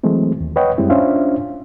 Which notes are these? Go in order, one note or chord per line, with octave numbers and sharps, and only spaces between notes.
E3 F#3 G#3 A3 C4
D#2
B4 C#5 D#5 F#5 G5
F#2 G3 G#3 C4 E4
C#4 D4 F4 C5 E5 F5